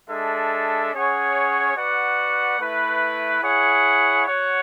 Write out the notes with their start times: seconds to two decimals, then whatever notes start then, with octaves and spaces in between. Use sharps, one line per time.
0.09 G#3 D4 A4 E5
0.93 C#4 G#4 C#5 F#5
1.76 F#4 B4 D5 F#5
2.59 A3 E4 B4
3.42 E4 G#4 C#5 F#5
4.25 F#4 C#5 F#5